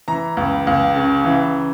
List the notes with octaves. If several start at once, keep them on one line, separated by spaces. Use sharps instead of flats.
E3 A#5
C#2
C#2
C#3
E3